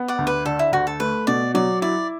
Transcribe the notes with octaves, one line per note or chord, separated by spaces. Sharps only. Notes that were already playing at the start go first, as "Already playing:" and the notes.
Already playing: B3
D5 F#5
D2
B4
D3 A4
E4
D2 F#4
A4
A3 B4
B2 D5
F#3 D5
E4 D5